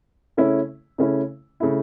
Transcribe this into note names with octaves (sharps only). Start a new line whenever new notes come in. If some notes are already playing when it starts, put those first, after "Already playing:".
C#3 A3 C#4 E4
C#3 A3 C#4 E4
C#3 A3 E4